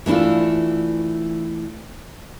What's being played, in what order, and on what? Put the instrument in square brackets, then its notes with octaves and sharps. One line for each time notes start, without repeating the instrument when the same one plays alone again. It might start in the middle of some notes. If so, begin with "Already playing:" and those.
[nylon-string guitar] E3 A3 D4 E4 F4